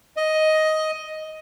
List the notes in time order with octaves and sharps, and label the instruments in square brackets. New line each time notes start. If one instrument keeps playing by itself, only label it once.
[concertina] D#5